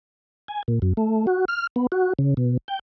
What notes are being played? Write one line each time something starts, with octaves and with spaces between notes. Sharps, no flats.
G#5
A#2
F#2
A3
F#4
F6
B3
F#4
C#3
B2
G5